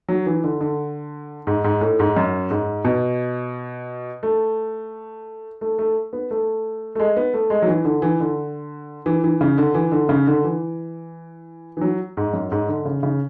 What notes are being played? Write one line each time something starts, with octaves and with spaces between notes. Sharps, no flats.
F#3
E3
D3
D3
G#2
G#2
A2
G#2
F#2
G#2
B2
A3
A3
A3
B3
A3
A3
G#3
B3
A3
G#3
F#3
E3
D3
E3
D3
E3
E3
C#3
D3
E3
D3
C#3
D3
E3
E3
F#3
G#2
F#2
G#2
D3
C#3
C#3